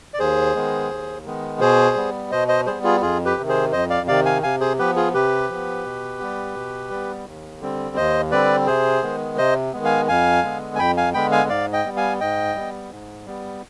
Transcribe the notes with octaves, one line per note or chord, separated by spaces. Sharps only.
D5
D#2 G#4 C5
D#3 G#3 B3
D#2
D#3 G#3 B3
B2 G#4 C5
G3 B3
B2 C5 D#5
C5 D#5
G3 B3 G#4 C5
F4 G#4
F2 F4 G#4
G4 B4
C3 D#3
G#4 C5
F2 C5 D#5
D5 F5
C3 D#3 D5 F5
F5 G#5
C3 F5 G#5
G#4 C5
F3 B3 G4 B4
F4 G#4
C3 G4 B4
F3 B3
B2
G3 B3
B2
G3 B3
D#2
D3 G3 C4
D#2 C5 D#5
D3 G3 C4 B4 D5
C3 G#4 C5
D#3 G#3 B3
C3 C5 D#5
D#3 G#3 B3
F5 G#5
F2 F5 G#5
D3 G#3 B3
G#5
F2 G5 B5
F5 G#5
D3 G#3 B3 G5 B5
F5 G#5
G#2 D5 F5
D#5 G5
G3 B3
F5 G#5
G#2 D#5 G5
G3 B3
G#2
G3 B3